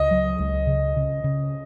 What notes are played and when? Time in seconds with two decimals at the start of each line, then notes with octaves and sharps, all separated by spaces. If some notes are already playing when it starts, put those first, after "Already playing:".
Already playing: C#2 D#5
0.11 F#3
0.39 C#2
0.67 C#3
0.96 C#3
1.24 C#3